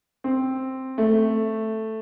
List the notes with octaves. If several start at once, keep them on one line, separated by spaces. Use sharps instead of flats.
C4
A3